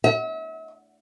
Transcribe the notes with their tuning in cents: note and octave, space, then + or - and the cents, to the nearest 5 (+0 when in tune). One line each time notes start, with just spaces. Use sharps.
E5 -40